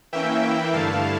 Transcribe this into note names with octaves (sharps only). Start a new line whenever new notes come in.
E3 A#3 C#4 E5 G5
E3 A#3 E4 E5 G5
G2 D3 A3 E4 F5 A5